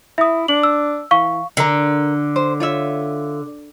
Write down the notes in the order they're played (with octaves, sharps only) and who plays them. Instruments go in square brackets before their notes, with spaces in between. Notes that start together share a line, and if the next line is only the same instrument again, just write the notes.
[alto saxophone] E4 [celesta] E5 D#6
[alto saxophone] D4 [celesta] F#7
[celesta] E6
[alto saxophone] E3 [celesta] F5 C#6
[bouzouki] D3 [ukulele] A#4 A#5
[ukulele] C5
F4 C#5 E5